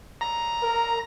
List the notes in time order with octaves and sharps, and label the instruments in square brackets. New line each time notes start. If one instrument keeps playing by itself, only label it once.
[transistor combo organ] A#5
[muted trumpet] A#4